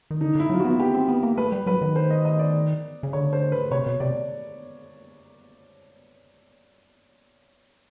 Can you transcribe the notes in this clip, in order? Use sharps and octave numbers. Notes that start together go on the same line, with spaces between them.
D#3
D3 D#4
D3 E4
F#3 F4
F#4
B3
B3 G4
C4
B3
A#3
A3 B4
G3
F#3 B4
D#3
C5
D#5
D#5
D5
C#3
D3 C#5
C5
B4
C3 C#5
B2
C3 D5